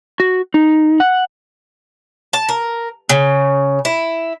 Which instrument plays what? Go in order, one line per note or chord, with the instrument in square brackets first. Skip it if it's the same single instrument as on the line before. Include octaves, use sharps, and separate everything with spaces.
[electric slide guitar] F#4
D#4
F#5
[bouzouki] A5
A#4
C#3
E4